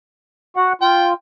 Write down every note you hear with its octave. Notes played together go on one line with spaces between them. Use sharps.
F#4 F#5
F4 G5